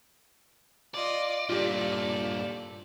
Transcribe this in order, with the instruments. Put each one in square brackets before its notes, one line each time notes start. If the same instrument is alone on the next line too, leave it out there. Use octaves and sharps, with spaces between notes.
[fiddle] F4 D#5 [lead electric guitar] D5
[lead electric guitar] G2 A#2 [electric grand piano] F4 G4 [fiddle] A4 D5